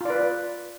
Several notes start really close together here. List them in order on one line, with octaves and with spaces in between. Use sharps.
F4 D5 B4